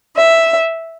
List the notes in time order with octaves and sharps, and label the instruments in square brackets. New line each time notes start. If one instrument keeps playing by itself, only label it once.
[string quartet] E5